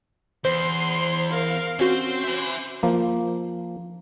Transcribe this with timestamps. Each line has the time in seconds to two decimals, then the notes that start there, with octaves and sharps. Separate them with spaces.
0.45 E2 C5 C6
1.30 A#4 F5
1.79 C4 C#4 F#4 C5
2.24 E5 G#5
2.83 F3 A#3